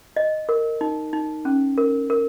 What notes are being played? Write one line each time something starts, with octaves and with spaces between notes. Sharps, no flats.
D#5
A#4
D#4
D#4
C#4
A#4
A#4